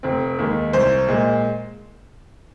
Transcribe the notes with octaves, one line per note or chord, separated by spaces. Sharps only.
F1 C4
D#2 D#3 G#3
C2 C5
A#2 G#3